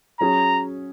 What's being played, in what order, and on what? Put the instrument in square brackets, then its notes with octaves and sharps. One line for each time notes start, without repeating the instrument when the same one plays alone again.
[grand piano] F#3 C#4 G#4 [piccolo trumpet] A#5